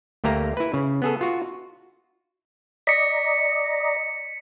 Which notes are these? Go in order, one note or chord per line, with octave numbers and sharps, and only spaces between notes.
D2 A3 A#3 G4 A#5
E4 B4
C#3
B3 G#4 A4
F4 F#4
D5 D#5 A#5 B6 C#7